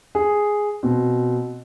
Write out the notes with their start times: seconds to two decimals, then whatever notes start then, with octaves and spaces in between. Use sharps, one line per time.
0.15 G#4
0.83 B2 C4